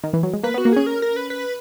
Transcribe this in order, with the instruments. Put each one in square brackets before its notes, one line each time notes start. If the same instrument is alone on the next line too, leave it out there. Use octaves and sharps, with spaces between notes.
[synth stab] D#3
E3
F#3
G#3
[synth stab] A#3 [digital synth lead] B4
[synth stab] B3
[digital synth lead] F#4
[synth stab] A#3
[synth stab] C#4 [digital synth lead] G#4
[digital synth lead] A#4
A#4
B4
B4